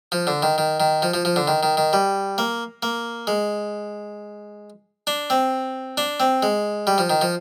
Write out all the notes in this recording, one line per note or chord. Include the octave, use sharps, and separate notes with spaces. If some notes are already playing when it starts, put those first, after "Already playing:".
F3
D3
D#3
D#3
D#3
F3
F3
F3
D3
D#3
D#3
D#3
G3
A#3
A#3
G#3
D4
C4
D4
C4
G#3
G3
F3
D#3
F3